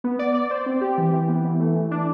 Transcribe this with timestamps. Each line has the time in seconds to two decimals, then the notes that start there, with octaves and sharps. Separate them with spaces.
0.04 B3
0.19 D5
0.34 D5
0.51 C5
0.66 C4
0.81 G4
0.98 E3
1.13 E3
1.28 B3
1.45 E3
1.60 A3
1.75 E3
1.91 D4